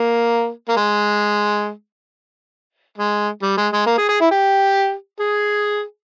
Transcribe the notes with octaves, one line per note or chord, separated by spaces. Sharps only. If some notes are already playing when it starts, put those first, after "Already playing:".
Already playing: A#3
A#3
G#3
G#3
G3
G#3
G#3
A#3
G#4
G#4
E4
G4
G#4